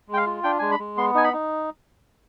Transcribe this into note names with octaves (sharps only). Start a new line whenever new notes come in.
G#3
G5
F5
F4
D4 G5
G#3 G#5
B5
G#3
B3 C6
D#4 G#5
B5
D#4